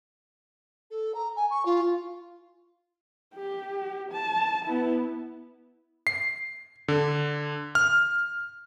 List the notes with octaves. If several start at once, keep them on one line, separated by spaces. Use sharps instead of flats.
A4
A#5
G#5
C#6
F4
G4
A5
B3 E4
C7
D3
F6